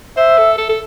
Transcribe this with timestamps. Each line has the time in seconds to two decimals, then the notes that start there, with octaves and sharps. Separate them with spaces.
0.17 C5 E5
0.38 A4
0.58 A4
0.70 A4